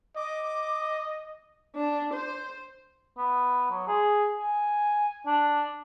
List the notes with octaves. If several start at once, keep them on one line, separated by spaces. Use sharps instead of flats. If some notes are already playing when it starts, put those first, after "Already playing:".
D#5 D6
D4
C5
B3
F#3
G#4
G#5
D4